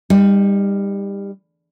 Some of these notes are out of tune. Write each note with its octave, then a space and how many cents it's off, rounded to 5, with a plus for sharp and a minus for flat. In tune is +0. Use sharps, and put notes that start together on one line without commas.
G3 +25 D#4 +0